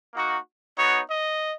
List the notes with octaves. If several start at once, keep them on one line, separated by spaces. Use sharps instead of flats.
A#3 D#4 F#4
B3 D#4 F#4 C#5
D#5